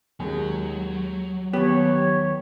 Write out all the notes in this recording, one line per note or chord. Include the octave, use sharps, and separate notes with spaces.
D#2 F#3 G#3
D#2 B3 G4 C#5